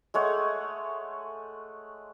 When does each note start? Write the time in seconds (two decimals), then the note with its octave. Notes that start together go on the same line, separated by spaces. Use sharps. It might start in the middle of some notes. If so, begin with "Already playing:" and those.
0.14 G#3 A3 C#5 F#5